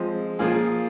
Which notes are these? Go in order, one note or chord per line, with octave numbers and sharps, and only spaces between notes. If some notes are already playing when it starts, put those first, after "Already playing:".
Already playing: F3 G#3 C4
F3 A#3 F4 G#4